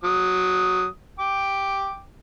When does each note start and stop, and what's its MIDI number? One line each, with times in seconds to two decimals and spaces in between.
0.04 0.86 54
0.04 0.86 87
1.19 2.00 79
1.19 2.00 86